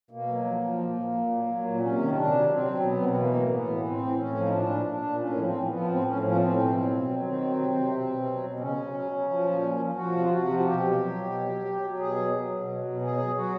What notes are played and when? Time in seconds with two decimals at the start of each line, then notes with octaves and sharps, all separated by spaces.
0.11 B2 A#3
0.28 F#3
0.45 F3
0.62 F3
0.79 A#2
0.95 A#2
1.13 A#2
1.30 F#3
1.46 F#3
1.64 A#2
1.80 C3 C#4
1.98 D#3
2.14 C3 D4
2.31 F#3
2.48 F#3 C4
2.66 F#3
2.82 B2 B3
3.00 B2 C4
3.09 B3
3.16 E3 A#3
3.34 A2
3.50 A2 B3
3.67 E3
3.84 A2 C4
4.01 A2
4.18 A2 C#4
4.35 F3
4.45 D#4
4.52 A#2 D4
4.69 A#2
4.86 A#2 D4
5.03 A#2
5.20 A2 C#4
5.37 F3
5.42 C4
5.54 F3
5.65 B3
5.71 F3
5.88 A2 C4
6.05 A2 C#4
6.22 F3 C#4
6.31 B3
6.39 A2 C4
6.56 B2
6.73 F#3
6.90 B2
7.07 F#3
7.24 D#3 C4
7.41 F#3
7.58 C3
7.75 C3
7.91 B2
8.08 B2
8.26 F#3
8.43 B2
8.59 C#3 C#4
8.76 C#3
8.94 F#3
9.11 F#3
9.27 F3
9.45 A#2
9.61 F3
9.78 F3
9.95 F3 F#4
10.12 C3
10.18 F4
10.29 C3 F#4
10.46 F3
10.59 F#4
10.64 B2 G4
10.80 F#3
10.97 F#3
11.14 B2
11.32 F#3
11.49 F#3
11.65 F#3
11.82 F#3
11.99 B2 G#4
12.16 F#3
12.33 F#3
12.51 B2
12.67 F#3
12.85 B2
13.01 F#3 G#4
13.18 F#3
13.35 F#3 F#4